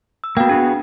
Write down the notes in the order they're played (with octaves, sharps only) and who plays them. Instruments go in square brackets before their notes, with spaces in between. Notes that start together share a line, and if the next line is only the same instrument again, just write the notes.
[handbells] E6
[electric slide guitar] A#3 B3 [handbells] F#4 F5 G5
[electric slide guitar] B3 F#4 G#4 [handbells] D4